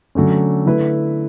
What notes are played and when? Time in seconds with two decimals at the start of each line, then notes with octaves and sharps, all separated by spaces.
0.15 D3 F#3 A3 C#4
0.67 D3 A3 E4 B4